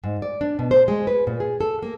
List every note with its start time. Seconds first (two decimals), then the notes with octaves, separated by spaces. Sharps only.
0.04 G#2
0.22 D5
0.41 D4
0.59 B2
0.71 C5
0.88 G#3
1.07 B4
1.27 A#2
1.40 G#4
1.61 A4
1.83 A#3